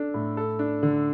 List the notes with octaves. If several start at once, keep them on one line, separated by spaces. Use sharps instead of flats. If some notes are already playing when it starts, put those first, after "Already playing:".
Already playing: D4 A4
A2
A4
D4
D3